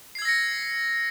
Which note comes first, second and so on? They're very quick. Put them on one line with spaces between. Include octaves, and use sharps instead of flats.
C7 G#6 E6 A#6 C#7